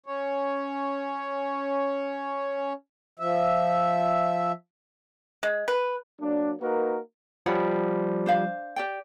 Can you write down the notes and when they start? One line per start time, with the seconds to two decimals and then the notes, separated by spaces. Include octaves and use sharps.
0.06 C#4 C#5
3.19 F3 E5
5.43 G#3
5.68 B4
6.21 F#3 A#3 D4
6.61 A#3 D#4 F#4 A#4 B4
7.46 F3 G3 C#5 F#5 B5
8.26 D4 C5 F5
8.76 G4 D5 G5